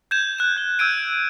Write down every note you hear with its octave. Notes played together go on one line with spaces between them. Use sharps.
G6 G#6 E7
F#6 E7
G6 G7
E6 G6 G#6 D7 D#7